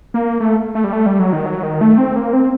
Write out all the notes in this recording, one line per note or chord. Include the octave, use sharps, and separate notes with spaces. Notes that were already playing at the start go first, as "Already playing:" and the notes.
A#3
A3
A3
G3
A3
G3
F#3
D#3
F#3
D#3
A3
C4
A#3
C4